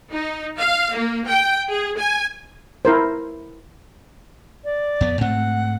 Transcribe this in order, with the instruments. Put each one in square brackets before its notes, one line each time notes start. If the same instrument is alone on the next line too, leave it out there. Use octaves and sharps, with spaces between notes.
[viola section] D#4
F5
A#3
G5
G#4
G#5
[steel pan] E4 A#4 C5
[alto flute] D5
[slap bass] F2 B3
[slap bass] G#2 A3 C4 [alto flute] F#5